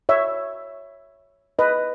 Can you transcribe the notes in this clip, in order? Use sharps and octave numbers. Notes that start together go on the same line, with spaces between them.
C#5 E5
B4 D#5